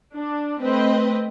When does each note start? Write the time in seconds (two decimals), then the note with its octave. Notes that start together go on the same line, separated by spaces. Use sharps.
0.15 D4
0.62 A3 C4 B4 D#5